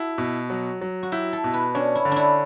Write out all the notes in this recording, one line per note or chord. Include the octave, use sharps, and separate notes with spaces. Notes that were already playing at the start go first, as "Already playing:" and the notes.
Already playing: E4 F#4 A4
B2
F#3
F#3
F#4
E4 G4
A4
B2
B4
C#4 D4
E4
D3
D4 E4